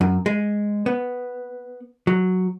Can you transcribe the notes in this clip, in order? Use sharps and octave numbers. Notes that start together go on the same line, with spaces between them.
F#2
G#3
B3
F#3